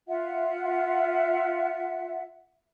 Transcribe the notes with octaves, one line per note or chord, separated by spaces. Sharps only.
F4 E5 F#5